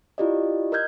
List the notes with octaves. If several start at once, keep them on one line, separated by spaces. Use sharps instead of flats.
E4 F4 G4 D5 D#5
A#4 D#5 F6 G6 G#6